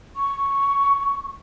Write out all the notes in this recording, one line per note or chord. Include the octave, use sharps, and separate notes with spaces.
C#6